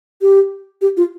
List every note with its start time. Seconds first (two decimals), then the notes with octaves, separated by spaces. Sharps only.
0.22 G4
0.81 G4
0.97 F4